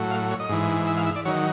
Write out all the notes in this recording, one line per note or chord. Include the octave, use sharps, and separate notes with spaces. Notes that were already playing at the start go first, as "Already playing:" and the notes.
Already playing: A2 F#3
F5
C#5
D#5
G#2 E3
E5
F5
E5
D5
D#3 F#3 C#5